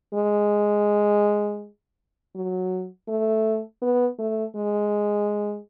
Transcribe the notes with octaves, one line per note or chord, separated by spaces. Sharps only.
G#3
F#3
A3
B3
A3
G#3